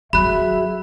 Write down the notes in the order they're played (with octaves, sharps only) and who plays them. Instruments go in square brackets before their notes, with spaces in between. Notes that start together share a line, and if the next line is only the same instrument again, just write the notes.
[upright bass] F#3 [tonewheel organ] F#4 G#4 [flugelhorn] E5 [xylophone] B5 F#6